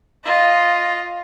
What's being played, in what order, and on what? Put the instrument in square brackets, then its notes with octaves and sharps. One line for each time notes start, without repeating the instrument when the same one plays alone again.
[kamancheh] F4 D#5